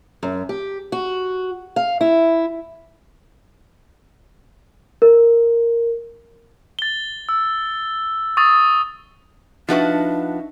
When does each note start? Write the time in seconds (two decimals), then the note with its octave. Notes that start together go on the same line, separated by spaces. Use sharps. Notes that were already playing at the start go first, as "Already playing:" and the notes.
0.23 F#2
0.49 G4
0.92 F#4
1.76 F5
2.01 E4
5.02 A#4
6.79 A6 G7
7.29 E6
8.37 C#6 D#6 A6
9.69 F3 D4 D#4 F#4 B4 E5 C#6